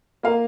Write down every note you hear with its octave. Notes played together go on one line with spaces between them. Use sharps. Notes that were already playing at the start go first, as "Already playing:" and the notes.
A#3 F4 A#4 F5